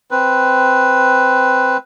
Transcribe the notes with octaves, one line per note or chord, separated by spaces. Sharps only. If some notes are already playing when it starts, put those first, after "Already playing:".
C4 B4